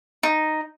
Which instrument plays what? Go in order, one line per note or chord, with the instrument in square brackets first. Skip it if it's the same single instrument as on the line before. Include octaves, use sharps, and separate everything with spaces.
[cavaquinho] D#4